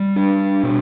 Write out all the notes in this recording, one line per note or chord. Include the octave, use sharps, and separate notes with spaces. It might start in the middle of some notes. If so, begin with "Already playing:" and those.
Already playing: G3
D4
B2